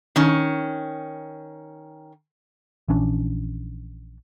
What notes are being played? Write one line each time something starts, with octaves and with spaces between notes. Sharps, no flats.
D#3 C#4
A#1 E3 C#4 D4